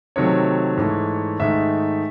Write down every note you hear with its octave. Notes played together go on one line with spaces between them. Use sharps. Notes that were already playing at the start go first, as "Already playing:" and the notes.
C3 D#3 F#3 A3 C#5
G#2 E3 A3
G#2 D#3 A3 E5